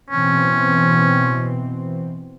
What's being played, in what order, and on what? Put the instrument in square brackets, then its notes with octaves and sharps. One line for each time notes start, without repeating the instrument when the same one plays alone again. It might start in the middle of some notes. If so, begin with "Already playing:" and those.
[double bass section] B2 E3 C4 [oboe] C#4